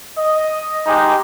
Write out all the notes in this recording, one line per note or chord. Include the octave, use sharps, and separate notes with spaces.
D#5
G#3 D#4 G4